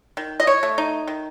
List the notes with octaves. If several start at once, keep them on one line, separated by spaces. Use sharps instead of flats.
D#3
D#5
C#5
A3
D#4
D#3